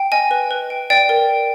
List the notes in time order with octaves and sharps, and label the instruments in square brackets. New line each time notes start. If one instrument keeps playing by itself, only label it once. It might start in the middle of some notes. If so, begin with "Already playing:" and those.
Already playing: [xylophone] G5
D#5 G#5
B4
B4
G5
D5 G5
A#4